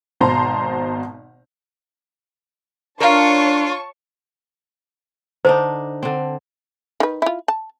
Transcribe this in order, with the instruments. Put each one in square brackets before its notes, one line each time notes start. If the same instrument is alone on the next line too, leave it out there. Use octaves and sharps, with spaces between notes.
[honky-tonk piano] G#1 B2 C5 A5 A#5 C6
[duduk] D4 [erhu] F4 [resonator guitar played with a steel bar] A#4 F5 [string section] C#5 A5 C#6
[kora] D3 D4 D#4 [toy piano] C5
[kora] D3 C4
[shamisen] D#3 B4
E4 F4
A5